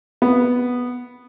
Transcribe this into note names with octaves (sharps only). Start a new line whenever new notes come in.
B3